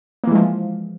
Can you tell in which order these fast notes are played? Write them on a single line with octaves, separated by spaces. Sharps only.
A#3 E3 G#3 F3